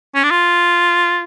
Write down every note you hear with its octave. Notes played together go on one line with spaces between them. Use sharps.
C#4
D4
F4